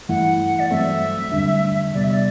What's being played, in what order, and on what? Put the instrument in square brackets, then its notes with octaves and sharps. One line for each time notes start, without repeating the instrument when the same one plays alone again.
[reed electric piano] G2 E3 A3 E4 [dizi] F#5
[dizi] D5
[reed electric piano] G2 F#3 A3 C4 [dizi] E5
[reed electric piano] E2 D3 G3 D4
[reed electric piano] C3 G3 B3 [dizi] D5
[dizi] E5
D5